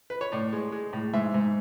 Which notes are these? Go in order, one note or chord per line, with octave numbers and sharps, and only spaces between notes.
B4
C#5
A2 D5
G#3
G#3
A2
G#2 E5
G#2